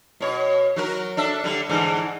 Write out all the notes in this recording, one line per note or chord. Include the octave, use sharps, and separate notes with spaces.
B2 C#5
F#3 F#4 A#4
D4 A4 E5
D3 G3
G#2 D3 E3